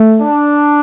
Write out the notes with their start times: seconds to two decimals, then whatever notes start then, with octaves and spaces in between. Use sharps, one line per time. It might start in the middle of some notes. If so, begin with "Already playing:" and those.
Already playing: A3
0.23 D4